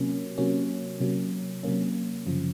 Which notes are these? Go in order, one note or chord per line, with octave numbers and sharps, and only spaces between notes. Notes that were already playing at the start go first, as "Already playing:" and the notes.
Already playing: C3 F#3 A#3 C#4
C3 F#3 A#3 C#4
C3 F#3 A#3 C#4
C3 F#3 A#3 C#4
F#2 C#3 F3